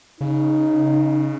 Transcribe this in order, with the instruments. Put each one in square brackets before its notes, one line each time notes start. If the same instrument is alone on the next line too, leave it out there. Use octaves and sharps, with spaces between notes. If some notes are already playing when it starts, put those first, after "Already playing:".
[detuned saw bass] C#3 [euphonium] D#4